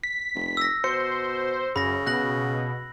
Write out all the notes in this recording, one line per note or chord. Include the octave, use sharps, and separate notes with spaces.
B6
F1
E6 A#6
B2 C5 C#7
F#2 C#3 B5 A#6
B2 F#6 A#6 F#7